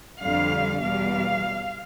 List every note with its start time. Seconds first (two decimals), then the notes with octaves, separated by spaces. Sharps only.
0.22 F2 D3 G3 F5
0.82 E2 B2 G3 F5